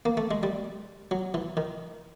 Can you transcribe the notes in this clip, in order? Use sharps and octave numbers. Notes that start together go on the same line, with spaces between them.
A#3
A3
G#3
G3
F#3
E3
D#3